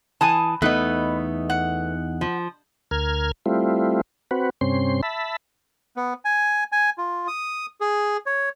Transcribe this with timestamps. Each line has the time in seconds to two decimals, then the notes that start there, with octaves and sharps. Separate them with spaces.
0.21 E3 G#5 A5 D#6
0.62 E2 A3 B3 D#4 B4 D#5
1.50 F#5
2.21 F3
2.91 D2 A#4 F6 G#6
3.46 G3 A3 C4 E4 F4
4.31 C4 F#4 B4
4.61 G2 C3 C4 C#4 C6
5.03 E5 A5 B5
5.97 B3
6.25 G#5
6.72 G#5
6.98 F4
7.28 D#6
7.81 G#4
8.26 C#5